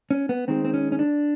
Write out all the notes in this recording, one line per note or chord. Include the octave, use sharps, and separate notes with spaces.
C#4
B3
D#3 G#3 C4
C4
C#4
C#4
D4